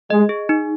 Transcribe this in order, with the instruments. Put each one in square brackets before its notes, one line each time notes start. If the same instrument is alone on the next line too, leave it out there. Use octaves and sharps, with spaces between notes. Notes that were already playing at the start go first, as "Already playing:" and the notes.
[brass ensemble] G#3 [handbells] D#5
[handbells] G#4
D#4